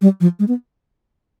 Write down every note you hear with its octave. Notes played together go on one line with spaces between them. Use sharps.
G3
F3
G#3
B3